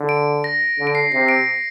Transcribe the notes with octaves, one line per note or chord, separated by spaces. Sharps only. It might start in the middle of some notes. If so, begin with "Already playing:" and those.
Already playing: D3
D7
A#6
D3
D7
C7
C3 C7
D7